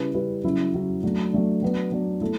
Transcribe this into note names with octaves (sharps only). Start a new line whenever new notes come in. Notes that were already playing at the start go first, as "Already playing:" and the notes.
Already playing: C#3 G3 C#4 E4 B4
C#3 G3 C#4 E4 B4
C#3 F#3 C#4 E4
C#3 F#3 C#4 E4
F#3 A3 D4
F#3 A3 D4
F#3 B3 D4
F#3 B3 D4
A3 E4 A4